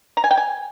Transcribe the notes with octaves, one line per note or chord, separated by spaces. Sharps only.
A#5
G#5
G5
G#5